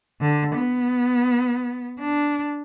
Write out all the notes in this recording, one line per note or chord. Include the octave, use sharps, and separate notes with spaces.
D3
B3
D4